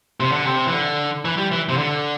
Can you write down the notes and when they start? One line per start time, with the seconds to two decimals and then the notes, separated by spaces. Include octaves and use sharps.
0.20 C3
0.32 D3
0.45 C3
0.67 E3
0.72 D3
1.25 E3
1.38 G3
1.52 E3
1.69 C3
1.77 D3